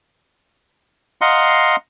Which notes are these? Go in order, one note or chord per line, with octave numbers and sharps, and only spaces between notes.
D#5 F5 F#5 A#5 C6